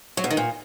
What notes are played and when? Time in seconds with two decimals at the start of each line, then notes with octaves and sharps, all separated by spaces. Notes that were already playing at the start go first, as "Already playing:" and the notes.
0.17 F#3
0.24 B2
0.31 D#3
0.37 A#2